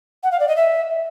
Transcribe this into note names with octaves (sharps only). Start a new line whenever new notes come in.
F#5
F5
D5
D#5
E5